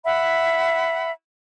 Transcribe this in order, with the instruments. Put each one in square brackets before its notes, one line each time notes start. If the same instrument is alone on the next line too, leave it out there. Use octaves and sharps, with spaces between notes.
[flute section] E5 F#5 B5